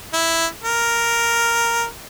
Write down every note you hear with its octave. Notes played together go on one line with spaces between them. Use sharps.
E4
A#4